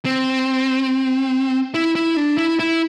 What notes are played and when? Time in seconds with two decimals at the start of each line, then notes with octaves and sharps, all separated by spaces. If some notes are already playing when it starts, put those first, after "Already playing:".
0.05 C4
1.74 E4
1.95 E4
2.17 D4
2.38 E4
2.59 E4